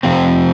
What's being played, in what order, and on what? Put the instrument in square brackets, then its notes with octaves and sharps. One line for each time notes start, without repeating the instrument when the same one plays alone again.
[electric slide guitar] F2 C3 F3 C4